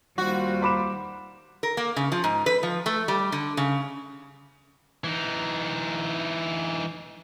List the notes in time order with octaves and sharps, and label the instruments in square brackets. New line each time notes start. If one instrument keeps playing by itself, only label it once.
[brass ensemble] D#2 F4 C5 [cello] G3 [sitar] F#4
[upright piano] B5 D6 E7
[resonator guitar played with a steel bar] A#4
A#3
C#3
F3
G#2
B4
F3
A3
G3
D3
C#3
[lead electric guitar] E3 D#4